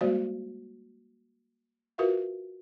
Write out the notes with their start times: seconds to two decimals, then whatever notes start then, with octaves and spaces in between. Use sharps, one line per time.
0.01 G3 G#3 A#3 F#4 C5 D5
1.98 F4 F#4 A#4 B4 E5 F5